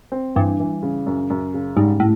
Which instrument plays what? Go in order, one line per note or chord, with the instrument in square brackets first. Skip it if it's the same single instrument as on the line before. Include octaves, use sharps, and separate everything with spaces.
[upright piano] C4
[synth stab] G2 [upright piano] E3
[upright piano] E3
C#3
F#2
F#2
C#3
[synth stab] G#2 [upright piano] G3
[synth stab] A2